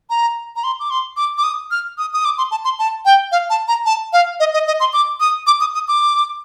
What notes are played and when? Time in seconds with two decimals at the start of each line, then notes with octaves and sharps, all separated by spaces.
0.10 A#5
0.56 A#5
0.64 C6
0.80 D6
0.90 C6
1.17 D6
1.38 D6
1.44 D#6
1.71 F6
1.98 D#6
2.13 D#6
2.25 D6
2.38 C6
2.51 A5
2.65 C6
2.79 A5
3.05 G5
3.32 F5
3.50 A5
3.68 A#5
3.86 A5
4.13 F5
4.40 D#5
4.54 D#5
4.67 D#5
4.80 C6
4.93 D6
5.20 D#6
5.47 D6
5.61 D#6
5.74 D#6
5.88 D6